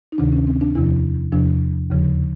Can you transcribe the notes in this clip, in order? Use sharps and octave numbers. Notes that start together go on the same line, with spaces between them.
D#4
D2 C3 D#3 D4
C#4
C4
D4
E2 C3 F3 E4
E2 C3 F3 D4
D#2 C#3 F3